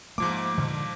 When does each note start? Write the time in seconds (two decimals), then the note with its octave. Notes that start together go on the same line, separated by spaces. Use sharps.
0.18 G#2 F3 A3 A#3 D6
0.58 A#2 D3